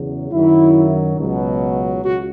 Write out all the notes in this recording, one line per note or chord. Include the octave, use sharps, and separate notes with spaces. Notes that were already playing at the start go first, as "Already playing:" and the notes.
Already playing: E2 C#3 F#3
F#2 D#3 F#3 E4
C#2 B2 F#3
C#2 F#4